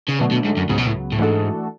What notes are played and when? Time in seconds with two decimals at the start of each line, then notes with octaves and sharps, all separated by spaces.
0.09 C#3
0.20 B2 D3 F#3 A3 D4
0.32 B2
0.45 G#2
0.57 F#2
0.69 C#2 G#2 C#3 F#3 B3
0.78 B2
0.86 A2
1.12 A2
1.18 G#2 E3 A3 D4 F#4 A4